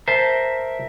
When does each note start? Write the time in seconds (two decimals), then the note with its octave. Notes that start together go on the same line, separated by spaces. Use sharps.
0.08 A#4 C5 E5 A5